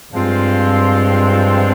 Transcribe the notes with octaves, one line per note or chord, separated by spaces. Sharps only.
G2 F3 G#3 C4 F4